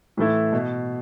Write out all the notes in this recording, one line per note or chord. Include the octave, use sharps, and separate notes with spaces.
A2 E3 A3 E4
B2